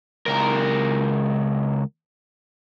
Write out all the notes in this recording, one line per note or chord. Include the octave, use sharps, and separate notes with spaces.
C#2 A#4